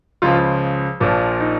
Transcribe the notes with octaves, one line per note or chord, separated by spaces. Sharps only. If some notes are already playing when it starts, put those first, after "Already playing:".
C#2 C#3 F3 F4
A#1 A#2 F3
D#4